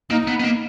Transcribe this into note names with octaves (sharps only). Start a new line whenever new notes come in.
A#3 D#4
B3
B3
A#3